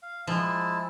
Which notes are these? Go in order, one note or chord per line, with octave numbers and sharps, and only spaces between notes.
F5
F3 G#3 E4 A5